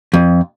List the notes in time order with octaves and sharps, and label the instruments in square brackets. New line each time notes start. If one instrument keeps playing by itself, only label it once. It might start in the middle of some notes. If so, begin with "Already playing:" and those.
[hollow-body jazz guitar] F2